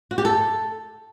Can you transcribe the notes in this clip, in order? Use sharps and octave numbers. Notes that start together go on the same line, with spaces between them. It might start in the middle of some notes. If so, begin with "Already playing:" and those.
F#4
G4
A4